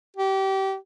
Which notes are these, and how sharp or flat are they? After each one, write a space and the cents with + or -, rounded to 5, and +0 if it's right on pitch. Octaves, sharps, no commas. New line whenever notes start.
G4 -25